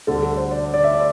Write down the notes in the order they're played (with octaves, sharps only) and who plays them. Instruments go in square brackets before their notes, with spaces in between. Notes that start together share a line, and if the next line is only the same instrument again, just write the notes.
[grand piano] D2 D3 G3 A4
A4
C5
D5
D5
E5
D5